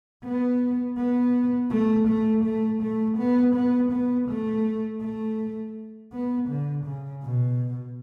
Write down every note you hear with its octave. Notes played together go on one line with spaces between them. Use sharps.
B3
B3
A3
A3
A3
A3
B3
B3
B3
A3
A3
B3
D3
C#3
B2